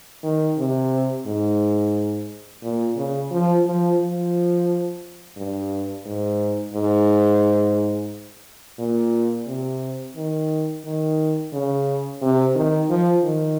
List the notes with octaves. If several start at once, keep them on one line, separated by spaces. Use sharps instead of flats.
D#3
C3
G#2
A#2
C#3
F3
F3
F3
G2
G#2
G#2
A#2
C3
D#3
D#3
C#3
C3
D#3
F3
D#3